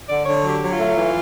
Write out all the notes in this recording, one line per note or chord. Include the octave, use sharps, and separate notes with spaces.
D3 D5
D3 C#5
F#3
G4
F#3
F4
A3
E3